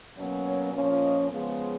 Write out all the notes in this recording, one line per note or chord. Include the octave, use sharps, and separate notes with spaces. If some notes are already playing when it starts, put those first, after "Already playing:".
B2 F#3 A#3 C#4
C#5
A#2 F3 A#3 C#4
D#5
C#3 F3 G#3 B3